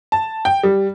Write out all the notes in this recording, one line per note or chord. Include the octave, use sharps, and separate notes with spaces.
A5
G5
G3